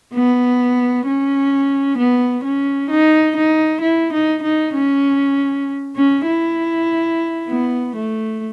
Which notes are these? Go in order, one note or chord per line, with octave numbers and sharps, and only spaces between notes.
B3
C#4
B3
C#4
D#4
D#4
E4
D#4
D#4
C#4
C#4
E4
B3
A3